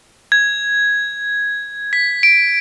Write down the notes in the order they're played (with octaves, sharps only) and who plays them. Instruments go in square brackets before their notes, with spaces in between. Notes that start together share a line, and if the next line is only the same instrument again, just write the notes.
[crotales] G#6
B6
D7